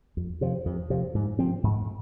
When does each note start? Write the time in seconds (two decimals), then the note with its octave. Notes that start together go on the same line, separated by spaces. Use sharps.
0.17 F2
0.41 C3 F3
0.65 F2
0.90 C3 F3
1.15 G#2
1.39 F3 C4
1.63 G#2